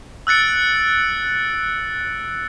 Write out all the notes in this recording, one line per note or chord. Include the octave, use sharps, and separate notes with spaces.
E6 F#6 A6 C#7 D7